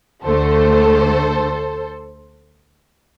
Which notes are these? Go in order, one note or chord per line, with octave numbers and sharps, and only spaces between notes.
D2 D3 A3 A4 C5